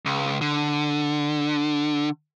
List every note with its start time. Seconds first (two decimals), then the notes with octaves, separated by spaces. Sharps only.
0.05 C#2
0.41 D3